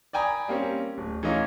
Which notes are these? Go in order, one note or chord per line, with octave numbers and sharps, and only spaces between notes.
D5 G5 G#5 A#5 B5 D#6
G3 A#3 C4 C#4
D1
E3 A3 C#4 D#4 F4